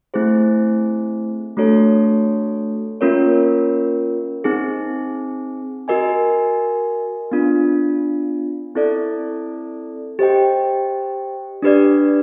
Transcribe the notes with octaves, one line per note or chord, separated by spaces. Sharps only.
A3 C4 E4 G#4 C5
A3 D4 F#4 A4 C#5
A#3 C#4 F4 A#4 C#5
C4 D#4 G#4
F#4 A#4 D#5 G#5
B3 D4 F4
C4 E4 A4 D5
G4 C5 D#5 G5
D4 G4 B4 D5